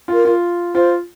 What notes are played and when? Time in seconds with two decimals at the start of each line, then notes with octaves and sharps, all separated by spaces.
0.08 F4 A#4
0.25 F4
0.75 F4 C5